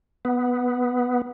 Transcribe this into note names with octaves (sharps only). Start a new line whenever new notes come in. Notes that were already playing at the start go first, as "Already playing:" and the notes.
B3